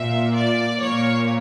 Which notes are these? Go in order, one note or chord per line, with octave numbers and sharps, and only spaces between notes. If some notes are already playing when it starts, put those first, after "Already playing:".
Already playing: A#2 A#3 E5
D5
A#2 A#3 C#5